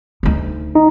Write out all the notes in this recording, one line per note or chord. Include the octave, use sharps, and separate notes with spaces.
D2 D#4
D#4